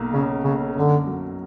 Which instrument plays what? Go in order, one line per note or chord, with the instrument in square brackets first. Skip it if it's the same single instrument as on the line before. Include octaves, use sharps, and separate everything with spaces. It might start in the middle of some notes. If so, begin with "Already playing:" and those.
Already playing: [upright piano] B1 A#3
[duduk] C#3 [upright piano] C#4
[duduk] C#3 [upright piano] A#3
[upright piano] F#2 [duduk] D3
[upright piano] F#3